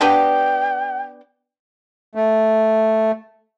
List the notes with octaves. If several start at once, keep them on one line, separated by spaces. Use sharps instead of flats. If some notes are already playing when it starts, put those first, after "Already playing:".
B3 D4 G4 G5
A3